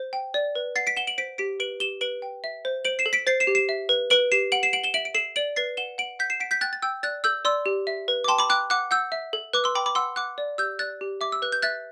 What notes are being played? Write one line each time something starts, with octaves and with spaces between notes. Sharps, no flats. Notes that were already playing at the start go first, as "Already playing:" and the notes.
Already playing: C5
G5
D5
B4
F#5 A6 C7
B6 D7
F#5 E7 G7
D7 F#7
C5 B6 D7
G4 B6 D7
B4 D7 F#7
G4 E7 G7
B4 D7 F#7
G5
E5
C5
C5 D7 F#7
C7 E7
A4
B6 D7
C5 A6 C7
C7 E7
G4
C7 E7
E5
B4
B4 D7 F#7
G4 C7 E7
F#5 D7 F#7
C7 E7
F#5 D7 F#7
E7 G7
E5 D7 F#7
D7
A4 C7 E7
D5 D7 F#7
B4 A6 C7
F#5 E7 G7
F#5 D7 F#7
F#5 G6 B6
C7 E7
F#5 B6 D7
G6 B6
G5 F#6 A6
A6
G5 E6 G6
D5 F#6 A6
A4 E6 G6
D5 C6 E6
G4
E5
B4
D6
G5 A5 C6
B5 D6
G5 D6 F#6
F#5 D6 F#6
F#5 E6 G6
E5
A4
B4 D6 F#6
C6 E6
G5 B5 D6
B5 D6
F#5 C6 E6
F#5 D6 F#6
D5
G4 E6 G6
D5 F#6 A6
G4
E5 D6
E6
B4 F#6
G6
E5 F#6 A6